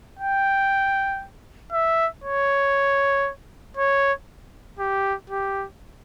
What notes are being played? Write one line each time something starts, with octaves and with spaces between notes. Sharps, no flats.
G5
E5
C#5
C#5
G4
G4